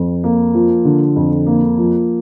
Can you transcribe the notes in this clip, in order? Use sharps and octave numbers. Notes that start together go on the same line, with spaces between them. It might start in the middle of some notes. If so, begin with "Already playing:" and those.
Already playing: F2
A#3
F3
D3
F2
A#3
F3